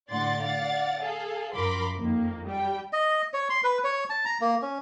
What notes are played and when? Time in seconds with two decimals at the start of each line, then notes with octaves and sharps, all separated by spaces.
0.10 A2 D3 D5 F#5 C6 A6
0.42 D5 F5 F#5 A6
1.01 G#4 A4 F5
1.54 F#2 F3 A#4 B5 C6 D6
1.96 F2 D#3 A#3
2.47 G3 G5
2.93 D#5
3.34 C#5
3.50 C6
3.64 B4
3.84 C#5
4.10 A5
4.25 A#5
4.41 A#3
4.62 C#4